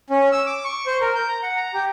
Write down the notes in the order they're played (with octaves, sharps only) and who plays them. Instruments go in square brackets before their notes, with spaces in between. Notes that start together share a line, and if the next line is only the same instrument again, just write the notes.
[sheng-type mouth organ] C#4
E6
D6
C#6
C5
A#4
G6
A#5
F#5
A#5
G4